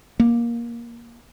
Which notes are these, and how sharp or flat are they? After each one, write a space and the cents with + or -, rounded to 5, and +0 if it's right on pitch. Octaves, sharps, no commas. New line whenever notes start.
A#3 +15